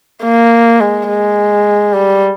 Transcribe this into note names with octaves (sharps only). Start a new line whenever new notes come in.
A#3
G#3
G#3
G3